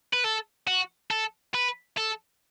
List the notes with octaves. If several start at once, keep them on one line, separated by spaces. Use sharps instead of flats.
B4
A4
F#4
A4
B4
A4